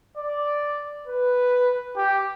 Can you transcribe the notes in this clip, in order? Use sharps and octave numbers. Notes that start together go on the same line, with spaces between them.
D5
B4
G4